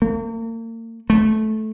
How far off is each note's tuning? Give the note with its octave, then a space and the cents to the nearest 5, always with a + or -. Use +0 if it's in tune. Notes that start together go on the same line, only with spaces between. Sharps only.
A#3 -40
A3 -15